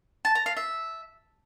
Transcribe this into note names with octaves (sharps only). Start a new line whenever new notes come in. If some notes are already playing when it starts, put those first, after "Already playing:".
A5
A#5
F5
E5